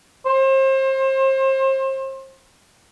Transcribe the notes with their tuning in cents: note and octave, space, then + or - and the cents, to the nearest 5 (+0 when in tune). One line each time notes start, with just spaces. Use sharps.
C5 +35